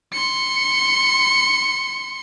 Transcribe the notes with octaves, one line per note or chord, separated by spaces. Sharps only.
C6 C#7